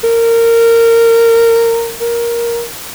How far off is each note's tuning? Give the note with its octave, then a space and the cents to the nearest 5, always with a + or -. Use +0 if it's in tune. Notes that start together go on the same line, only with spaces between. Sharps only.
A#4 -20
A#4 +10